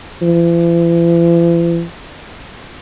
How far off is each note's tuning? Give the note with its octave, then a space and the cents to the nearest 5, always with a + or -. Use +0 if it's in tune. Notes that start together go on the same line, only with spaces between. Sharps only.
E3 +45